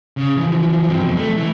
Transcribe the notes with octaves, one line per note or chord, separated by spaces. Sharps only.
C#3
E3 F3
G2 C4
F2 B2
A3
E3